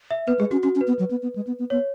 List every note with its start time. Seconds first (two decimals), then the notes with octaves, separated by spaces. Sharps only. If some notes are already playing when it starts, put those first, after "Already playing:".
0.11 E5
0.27 B3 B4
0.39 G#3 G#4
0.51 C#4 F#4
0.63 C#4 F#4
0.75 C#4
0.81 B4
0.87 B3
0.99 F#3
1.11 B3
1.23 B3
1.36 G#3
1.47 B3
1.59 B3
1.70 B3 C#5